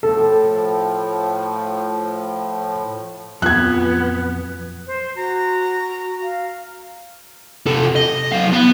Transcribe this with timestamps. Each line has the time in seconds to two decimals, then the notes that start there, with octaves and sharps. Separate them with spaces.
0.03 A2 F3 A4
3.42 F2 A#2 F#3 B3 F4 F#6 G#6
4.87 C5
5.16 F#4 A#5
6.22 F5
7.67 C3 A4
7.96 D#5
8.32 F#3 F5
8.52 B3